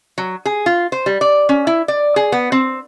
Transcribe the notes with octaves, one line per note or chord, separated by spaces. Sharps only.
F#3
G#4
F4
C5
G3
D5
C#4
E4
D5
G#4
B3
C4